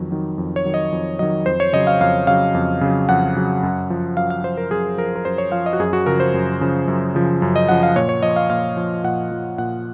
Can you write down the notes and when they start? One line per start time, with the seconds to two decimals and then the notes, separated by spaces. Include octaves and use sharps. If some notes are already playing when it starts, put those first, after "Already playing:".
Already playing: F2 D#3 F#3
0.11 D#3 F#3
0.38 F2
0.56 C#5
0.65 D#3 F#3
0.74 D#5
0.92 F2
1.19 D#3 F#3 D#5
1.46 F2 C5
1.60 C#5
1.73 C#3 F#3 D#5
1.87 F5
2.00 F2 F5
2.27 C#3 F#3 F5
2.55 F2
2.81 C#3 F#3
3.09 F2 F#5
3.36 C#3 F#3
3.63 F#2
3.90 F3
4.17 F#2 F5
4.30 F5
4.43 F3 C5
4.57 A#4
4.71 F#2 G#4
4.98 F3 A#4
5.16 A#4
5.25 F#2 C5
5.38 C#5
5.52 F3 F5
5.66 D#5
5.73 F#4
5.80 F#2 G#4
5.93 F#4
6.06 C#3 F3 A#4
6.20 C5
6.34 F#2
6.61 C#3 F3
6.88 F#2
7.15 C#3 F3
7.42 F#2
7.56 D#5
7.69 C#3 F3 F#5
7.83 F5
7.96 A#2 C#5
8.09 C#5
8.23 F3 D#5
8.36 F5
8.50 A#2 F5
8.77 F3
9.04 A#2 F#5
9.31 F3
9.58 A#2 F#5